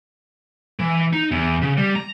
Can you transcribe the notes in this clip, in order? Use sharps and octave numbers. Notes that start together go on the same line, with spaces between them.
E3
D#4
E2
C#3
G3
A#5